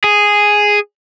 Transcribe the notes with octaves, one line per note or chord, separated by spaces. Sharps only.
G#4